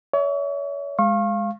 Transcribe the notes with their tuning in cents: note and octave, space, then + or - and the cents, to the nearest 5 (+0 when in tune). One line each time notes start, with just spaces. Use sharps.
C#5 +35 E5 -20
G#3 +0 F5 -10 C#6 -35